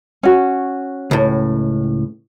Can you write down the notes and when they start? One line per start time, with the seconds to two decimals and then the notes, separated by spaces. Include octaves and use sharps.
0.23 C#4 F#4
1.11 C#2 A2